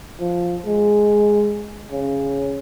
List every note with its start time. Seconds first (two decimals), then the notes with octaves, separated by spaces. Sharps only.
0.20 F3
0.66 G#3
1.92 C#3